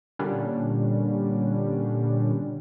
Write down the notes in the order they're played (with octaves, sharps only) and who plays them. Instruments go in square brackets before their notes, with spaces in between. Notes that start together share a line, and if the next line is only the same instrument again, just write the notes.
[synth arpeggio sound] A#2 D3 G3 C#4 D4